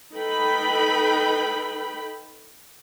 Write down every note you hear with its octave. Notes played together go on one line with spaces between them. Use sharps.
D#4 A4 B4 G5 B5